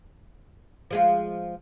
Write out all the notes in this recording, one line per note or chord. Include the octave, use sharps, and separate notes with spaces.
F3 G#3 F4